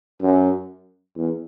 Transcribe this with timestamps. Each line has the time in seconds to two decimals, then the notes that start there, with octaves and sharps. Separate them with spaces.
0.22 F#2
1.16 E2